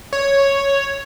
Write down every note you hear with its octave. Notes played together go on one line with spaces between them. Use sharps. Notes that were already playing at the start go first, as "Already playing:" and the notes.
C#5